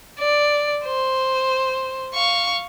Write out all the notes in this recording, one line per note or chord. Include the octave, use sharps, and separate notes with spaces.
D5
C5
F5 C#6